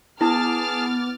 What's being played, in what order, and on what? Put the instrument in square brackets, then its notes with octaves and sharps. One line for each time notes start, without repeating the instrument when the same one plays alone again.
[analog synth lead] B3 [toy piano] E4 [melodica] G#4 A5 [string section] D6 F6 A6